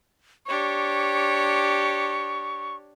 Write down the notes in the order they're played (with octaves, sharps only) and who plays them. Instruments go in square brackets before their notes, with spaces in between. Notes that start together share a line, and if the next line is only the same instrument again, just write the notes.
[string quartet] D4 G4 C#5 [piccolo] C#6